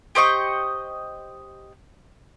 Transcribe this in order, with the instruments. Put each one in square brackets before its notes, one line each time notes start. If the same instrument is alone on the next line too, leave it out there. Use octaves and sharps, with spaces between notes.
[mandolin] G4 C5 D#5 C#6